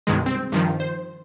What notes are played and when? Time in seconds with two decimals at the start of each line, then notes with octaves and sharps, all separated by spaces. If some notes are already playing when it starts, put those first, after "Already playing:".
0.07 C2 G2 B2 D#3 G#3
0.26 C4
0.52 G2 D#3 F3
0.80 C5